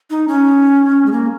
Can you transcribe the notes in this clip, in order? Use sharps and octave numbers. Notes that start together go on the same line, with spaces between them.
D#4
C#4
G#3
A#3